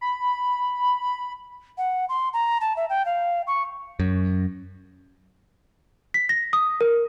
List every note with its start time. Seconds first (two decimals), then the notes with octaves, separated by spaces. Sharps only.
0.01 B5
1.78 F#5
2.09 C6
2.33 A#5
2.61 A5
2.77 E5
2.90 G5
3.06 F5
3.47 C#6
4.00 F#2
6.14 B6
6.29 A#6
6.53 D#6
6.81 A#4